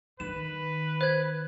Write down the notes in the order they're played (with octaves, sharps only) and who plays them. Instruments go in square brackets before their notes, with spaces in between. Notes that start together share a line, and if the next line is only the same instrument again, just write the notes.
[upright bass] D#3 [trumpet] B4 [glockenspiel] E7
[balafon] C5 [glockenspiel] F#6 G#6